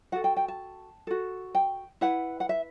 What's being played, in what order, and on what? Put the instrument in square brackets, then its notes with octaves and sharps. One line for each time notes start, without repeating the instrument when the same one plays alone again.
[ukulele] F#4 A4 F#5
G5
G5
A5
F#4 A4
G5
E4 B4 F#5
F#5
E5